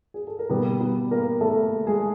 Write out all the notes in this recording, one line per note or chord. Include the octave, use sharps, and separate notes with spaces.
G#4
A4
A#4
B2 G3 A#3 B3 B4
B3 B4
A#3 A#4
A3 A4
G#3 G#4